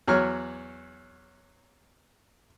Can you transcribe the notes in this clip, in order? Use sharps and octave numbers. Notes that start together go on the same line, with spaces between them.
E2 F#3 C#5 F6